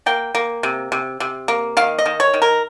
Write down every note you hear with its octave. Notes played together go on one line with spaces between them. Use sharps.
A#3 G5
A#3
C3
C3
C3
A#3
D#3 F5
D#5
D#3
C#5
D#3
A#4